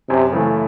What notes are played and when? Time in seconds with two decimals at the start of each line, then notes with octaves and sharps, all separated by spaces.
0.10 F#2 C3
0.32 C#3 E3 A3